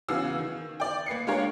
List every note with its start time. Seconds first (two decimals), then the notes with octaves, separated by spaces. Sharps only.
0.08 C#3 E3 B3 F#4 F5 E6
0.38 D#3
0.80 D5 G5
1.06 A#3 B4 C7 C#7
1.27 G#3 D4 F4 G4 A#4 C#5